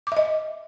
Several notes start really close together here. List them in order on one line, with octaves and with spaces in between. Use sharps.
D6 E5 D#5